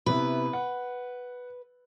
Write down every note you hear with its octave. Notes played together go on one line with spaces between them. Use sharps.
C3 B3 E4 B4
F#5